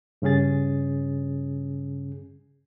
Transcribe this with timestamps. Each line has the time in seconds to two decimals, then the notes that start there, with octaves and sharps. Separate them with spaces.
0.22 G2 C#3 C#4 G#4 A6